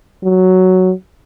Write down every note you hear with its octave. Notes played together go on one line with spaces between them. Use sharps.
F#3